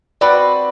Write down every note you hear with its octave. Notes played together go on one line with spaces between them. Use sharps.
C4 F#4 B4 D5